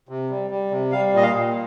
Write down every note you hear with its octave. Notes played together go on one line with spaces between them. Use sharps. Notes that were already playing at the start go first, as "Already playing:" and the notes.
C3
G3
G3
C3
G3 F5
A#2 D#5
F5
A#2